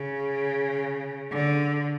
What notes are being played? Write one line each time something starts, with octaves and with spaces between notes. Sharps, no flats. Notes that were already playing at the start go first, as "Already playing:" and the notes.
Already playing: C#3
D3